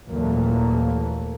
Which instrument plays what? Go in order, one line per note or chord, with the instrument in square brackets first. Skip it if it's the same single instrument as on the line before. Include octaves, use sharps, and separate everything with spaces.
[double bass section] D#2 A#2 E3 F#3 A3 A#3